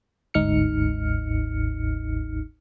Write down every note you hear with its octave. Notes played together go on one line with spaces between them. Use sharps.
G1 D2 G#2 D#4 F6 C#7